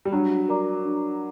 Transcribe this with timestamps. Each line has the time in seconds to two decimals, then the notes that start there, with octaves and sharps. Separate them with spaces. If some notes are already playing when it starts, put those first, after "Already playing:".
0.05 G3
0.12 F#3 D4
0.49 A#4 D5 A#5 D6
0.85 D4